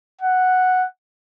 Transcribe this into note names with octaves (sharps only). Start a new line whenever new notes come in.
F#5